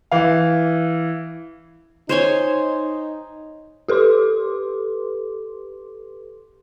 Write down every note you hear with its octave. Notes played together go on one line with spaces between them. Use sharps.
E3 F5
D#4 C5 C#5 G#5
G4 A4 B4 C6 D6